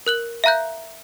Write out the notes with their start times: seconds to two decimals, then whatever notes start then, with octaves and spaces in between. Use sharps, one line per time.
0.06 A#4 F#6 F#7
0.44 E5 F5 A#5 F#6 G6